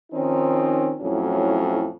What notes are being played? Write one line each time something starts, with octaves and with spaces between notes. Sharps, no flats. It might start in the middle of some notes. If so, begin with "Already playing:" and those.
D#3 F3 C4 C#4 D#4
F2 A2 F#3 C#4 E4